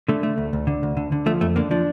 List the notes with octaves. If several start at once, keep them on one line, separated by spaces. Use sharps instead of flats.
D3 A3
A3
D2
D2
D3
D2
D3
D3
F3 A3
F2 A3
D3 A#3
F3 D4